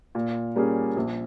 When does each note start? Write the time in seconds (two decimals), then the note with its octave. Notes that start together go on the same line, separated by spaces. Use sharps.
0.15 A#2
0.56 G3 A#3 C#4 G#4
0.96 A#1